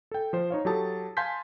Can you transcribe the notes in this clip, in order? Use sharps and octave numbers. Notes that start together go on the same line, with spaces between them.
A4 G5
F3 C5
D#4 C#5 F5
F#3 E4 G4 A4 A5 D#6
F5 G#5 A5 C6 G6 B6